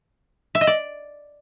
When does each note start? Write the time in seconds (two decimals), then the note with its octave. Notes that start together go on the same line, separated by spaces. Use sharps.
0.55 E5
0.61 D#5
0.67 D5